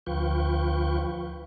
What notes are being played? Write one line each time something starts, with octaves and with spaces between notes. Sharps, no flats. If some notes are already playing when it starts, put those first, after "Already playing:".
D2 F3 F4 B4 G5 C#6